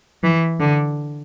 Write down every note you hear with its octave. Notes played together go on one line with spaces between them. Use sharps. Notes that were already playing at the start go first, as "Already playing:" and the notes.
E3
D3